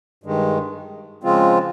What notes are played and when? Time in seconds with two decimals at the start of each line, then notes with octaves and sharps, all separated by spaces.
0.24 G2 D#3 G#3
1.24 C#3 F3 G#3 C4 F4